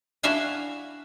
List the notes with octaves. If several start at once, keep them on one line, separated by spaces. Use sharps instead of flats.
D4 E4 F#4 E5 F5 G#5